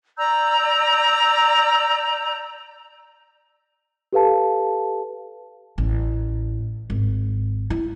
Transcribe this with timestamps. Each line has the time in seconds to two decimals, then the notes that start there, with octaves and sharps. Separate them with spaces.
0.18 D5 A#5 E6 G6
4.13 G4 A4 B4 F5 A5
5.78 A1
6.90 G#1
7.70 E4